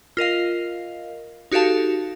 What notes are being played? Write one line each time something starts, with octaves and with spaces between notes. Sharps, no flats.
F4 A#4 D#5 F5
D#4 F#4 G4 A4 F5 A5